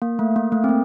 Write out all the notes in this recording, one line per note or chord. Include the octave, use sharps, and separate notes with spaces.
A#3
A3
A#3
A3
C4
A#3